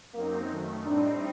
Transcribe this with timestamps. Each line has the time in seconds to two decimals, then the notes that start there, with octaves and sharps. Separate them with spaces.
0.14 F#2 F#3 A#3 C4 D#4
0.50 F#2 D#3 A3
0.85 A2 G3 C4 D4 D#4